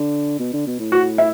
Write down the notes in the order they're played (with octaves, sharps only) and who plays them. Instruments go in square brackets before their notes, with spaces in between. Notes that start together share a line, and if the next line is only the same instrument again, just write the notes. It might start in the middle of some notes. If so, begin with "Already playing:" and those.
Already playing: [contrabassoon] D3
B2
D3
B2
A2
[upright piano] F#4
E4